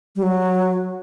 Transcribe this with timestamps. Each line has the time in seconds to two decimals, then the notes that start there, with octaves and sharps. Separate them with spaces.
0.16 G3
0.23 F#3